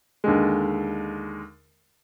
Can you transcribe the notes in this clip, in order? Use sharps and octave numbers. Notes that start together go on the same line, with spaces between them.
D#2 D3 G#3